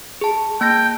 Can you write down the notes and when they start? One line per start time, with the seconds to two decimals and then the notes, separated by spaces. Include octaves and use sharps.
0.21 G#4 A5
0.61 A#3 G5 A5 A#6